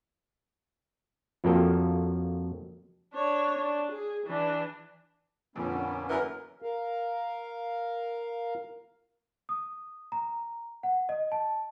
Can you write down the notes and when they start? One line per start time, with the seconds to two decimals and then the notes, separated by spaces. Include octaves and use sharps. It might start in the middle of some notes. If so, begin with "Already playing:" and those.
1.44 F2 F3 F#3 A#3 A4 G5
3.14 D4 C#5
3.58 D4
3.92 G#4
4.27 E3 D4
5.56 F2 A#2 D3 A#3 B3 C#4
6.09 F#2 D3 E3 A#4
6.62 A#4 F5
9.49 D#6
10.12 A#5
10.83 F#5
11.09 D#5
11.32 A5